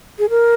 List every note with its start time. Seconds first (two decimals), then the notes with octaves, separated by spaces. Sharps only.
0.19 G#4
0.30 A#4